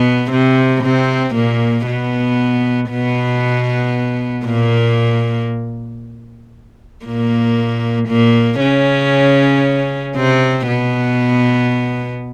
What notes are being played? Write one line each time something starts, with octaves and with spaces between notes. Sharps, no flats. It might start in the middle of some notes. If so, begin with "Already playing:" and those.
Already playing: B2 B3
C3 C4
C3 C4
A#2 A#3
B2 B3
B2 B3
A#2 A#3
A#2 A#3
A#2 A#3
C#3 C#4
C3 C4
B2 B3